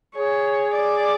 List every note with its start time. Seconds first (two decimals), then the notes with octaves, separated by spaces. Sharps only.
0.16 G#4 C#5
0.75 D5